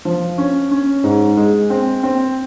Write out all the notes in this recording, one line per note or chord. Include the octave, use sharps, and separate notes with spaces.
F3
C#4
C#4
G#2
G#3
C4
C4